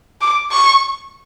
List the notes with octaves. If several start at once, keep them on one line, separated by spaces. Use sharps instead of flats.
D6
C#6